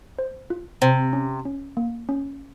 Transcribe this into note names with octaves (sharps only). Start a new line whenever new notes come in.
C5
F4
C3 C5
C#4
C#4
A#3
C#4